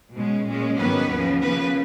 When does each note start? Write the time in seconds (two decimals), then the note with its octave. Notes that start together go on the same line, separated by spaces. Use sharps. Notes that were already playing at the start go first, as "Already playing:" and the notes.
0.15 B2 G#3 C#4
0.47 A#2 G#3 C#4
0.78 G#2 D#3 F#3 A#3 B3 C#4 B4
1.11 D#2 C#3 F3
1.42 C#3 F3 A#3 B3 B4